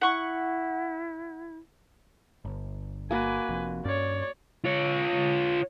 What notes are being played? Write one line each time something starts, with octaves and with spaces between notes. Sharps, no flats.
E4 F#5 C#6
G1
A#3 F#4 B4 G#5
F1 F2
G2 C#4 C#5 D5
F4 C#5